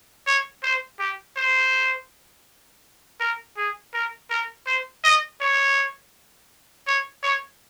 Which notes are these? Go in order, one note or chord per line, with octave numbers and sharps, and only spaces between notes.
C#5
C5
G4
C5
A#4
G#4
A#4
A#4
C5
D#5
C#5
C#5
C#5